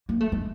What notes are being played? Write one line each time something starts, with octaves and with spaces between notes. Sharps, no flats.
A#3
A3
G#3